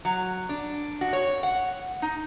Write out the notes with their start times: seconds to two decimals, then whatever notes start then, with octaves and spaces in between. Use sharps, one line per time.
0.05 F#3
0.49 D4
1.01 F#4
1.13 C#5
1.43 F#5
2.02 D#4